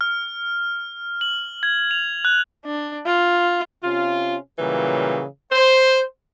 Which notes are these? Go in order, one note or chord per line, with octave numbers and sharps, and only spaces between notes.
F6
F#7
G#6
F7
F#6
D4
F4
C3 C#4 F4
A#2 C#3 E3 F#3 G3
C5